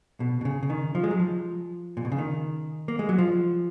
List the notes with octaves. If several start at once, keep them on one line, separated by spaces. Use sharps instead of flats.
B2
B2
C#3
C#3
D#3
F3
G#3
F#3
F3
A#2
B2
C#3
D#3
A#3
G#3
F#3
F3